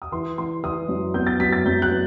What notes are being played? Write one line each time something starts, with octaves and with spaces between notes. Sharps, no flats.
D#6
E3 C6
E3 C6
E3 D#6
F#2
B3 G6
A6
F#2 B6
A6
F#2 G6
F#6
B3